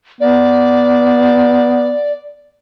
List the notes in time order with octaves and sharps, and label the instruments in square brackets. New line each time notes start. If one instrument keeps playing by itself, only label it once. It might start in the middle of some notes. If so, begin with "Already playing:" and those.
[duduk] B3 [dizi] D5